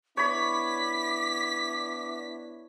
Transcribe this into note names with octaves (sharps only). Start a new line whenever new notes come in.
B3 D4 E4 C#5 B5 D6 B6